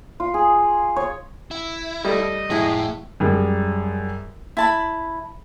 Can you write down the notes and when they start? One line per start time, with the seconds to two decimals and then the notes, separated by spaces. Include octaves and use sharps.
0.20 F4
0.34 G#4
0.96 C#5
1.51 E4
2.05 G3 A3 D#5
2.50 F2 A2 G#3 E4
3.20 F#2 G3 G#3
4.57 E4 A5 B5